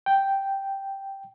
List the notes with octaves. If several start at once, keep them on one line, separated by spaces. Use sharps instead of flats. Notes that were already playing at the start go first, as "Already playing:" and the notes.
G5